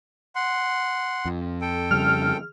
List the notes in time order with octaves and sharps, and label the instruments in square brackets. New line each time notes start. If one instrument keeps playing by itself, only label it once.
[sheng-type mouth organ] F#5 C6
[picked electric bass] F2
[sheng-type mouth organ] A4 G5
[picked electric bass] F2 C#3 G3 [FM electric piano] F6